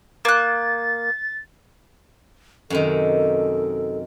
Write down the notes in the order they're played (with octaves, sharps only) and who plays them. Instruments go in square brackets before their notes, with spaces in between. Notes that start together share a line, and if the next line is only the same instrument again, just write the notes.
[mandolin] A#3 F#6 [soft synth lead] A6
[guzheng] F#2 C3 D#3 [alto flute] A4